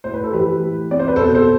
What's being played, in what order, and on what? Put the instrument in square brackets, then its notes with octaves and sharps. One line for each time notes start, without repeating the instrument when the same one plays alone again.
[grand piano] A2 C5
B4
A4
E3 G4 B4
A2
C4 D5
C5
B4
B2 A4 C5
A4 C5